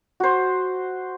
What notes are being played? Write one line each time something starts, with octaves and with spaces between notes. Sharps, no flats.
F#4 C5